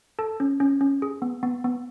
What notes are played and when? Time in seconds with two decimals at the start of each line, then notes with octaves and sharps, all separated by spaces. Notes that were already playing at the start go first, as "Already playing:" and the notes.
0.19 A4 A5
0.40 C#4
0.60 C#4
0.81 C#4
1.02 G#4
1.22 B3
1.43 B3
1.64 B3